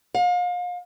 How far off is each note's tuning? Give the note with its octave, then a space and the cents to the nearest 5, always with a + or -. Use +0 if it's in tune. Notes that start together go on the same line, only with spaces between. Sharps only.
F5 +35